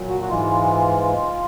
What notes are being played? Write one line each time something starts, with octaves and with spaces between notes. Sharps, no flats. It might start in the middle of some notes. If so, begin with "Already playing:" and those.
Already playing: A#2 F#3
F#4
F#4
G#2 E3 G#3 F4